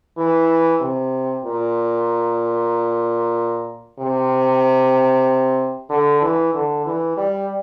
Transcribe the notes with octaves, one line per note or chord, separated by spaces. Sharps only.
E3
C3
A#2
C3
D3
E3
D3
E3
G3